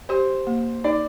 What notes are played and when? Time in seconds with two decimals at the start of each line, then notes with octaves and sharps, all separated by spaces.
0.09 G4 C5
0.47 A#3
0.84 D#4 D5